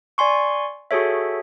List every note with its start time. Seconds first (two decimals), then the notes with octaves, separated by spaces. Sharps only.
0.18 D5 G#5 C6 C#6
0.91 F#4 G#4 A4 C#5 E5